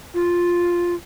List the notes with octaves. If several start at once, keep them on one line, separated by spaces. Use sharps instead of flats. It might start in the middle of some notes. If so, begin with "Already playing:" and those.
F4